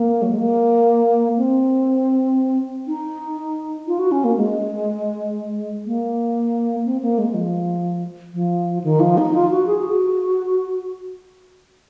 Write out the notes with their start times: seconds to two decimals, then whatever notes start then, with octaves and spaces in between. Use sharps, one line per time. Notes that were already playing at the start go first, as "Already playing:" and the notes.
Already playing: A#3
0.22 F#3
0.31 G#3
0.39 A#3
1.38 C4
2.88 D#4
3.87 F4
3.99 F#4
4.12 C#4
4.24 A#3
4.37 G#3
5.86 A#3
6.85 C4
7.01 A#3
7.18 G#3
7.34 F3
8.34 F3
8.84 D#3
9.00 F3
9.18 D#4
9.34 F4
9.51 F#4
9.67 G#4
9.83 F#4